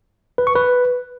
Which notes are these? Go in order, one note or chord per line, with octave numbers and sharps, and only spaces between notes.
B4
C#6
B4